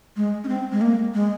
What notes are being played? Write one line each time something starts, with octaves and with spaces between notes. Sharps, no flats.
G#3
C#4
C4
G#3
A#3
G#3